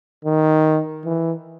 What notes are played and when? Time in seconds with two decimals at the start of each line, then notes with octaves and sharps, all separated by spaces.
0.25 D#3
1.05 E3